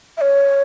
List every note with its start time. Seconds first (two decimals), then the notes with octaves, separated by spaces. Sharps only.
0.17 E5
0.21 C#5